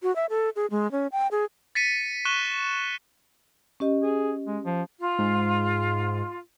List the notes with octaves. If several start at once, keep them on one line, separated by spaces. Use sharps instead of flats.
F#4
E5
A4
G#4
G#3
C#4
G5
G#4
A6 B6 C#7 D#7
C#6 F#6 D#7 E7 G7
C#4 G4 D#5
G#4
G#3
F3
F4
G#2